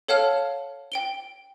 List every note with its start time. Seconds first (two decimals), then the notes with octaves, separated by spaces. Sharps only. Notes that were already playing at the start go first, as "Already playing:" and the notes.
0.08 A4 C#5 F5 F#5 A5 F6
0.92 G5 D7 G7